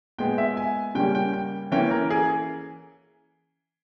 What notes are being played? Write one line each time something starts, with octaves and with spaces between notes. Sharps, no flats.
A#2 G#3 B3 G5
E5
G#5
C#3 G3 A#3 C#4 G5
G5
G5
E3 A#3 C#4 G5
A#4
G#4